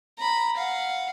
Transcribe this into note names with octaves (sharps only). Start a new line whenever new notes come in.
A#5 B5
F5 F#5